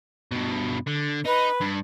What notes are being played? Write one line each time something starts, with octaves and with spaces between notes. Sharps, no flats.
G2 B2
D3
D#4 B4
G2